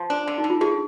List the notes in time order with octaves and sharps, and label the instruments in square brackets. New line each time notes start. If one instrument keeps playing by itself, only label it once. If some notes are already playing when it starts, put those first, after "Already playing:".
Already playing: [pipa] F3
D4
D3
[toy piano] D#4
[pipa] D3
[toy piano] F4
[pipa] D3 [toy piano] G#4